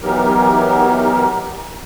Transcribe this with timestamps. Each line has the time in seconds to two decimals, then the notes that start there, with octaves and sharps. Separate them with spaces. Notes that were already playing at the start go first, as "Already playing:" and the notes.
0.03 E3 F#3 B3 D#4 G4 A#4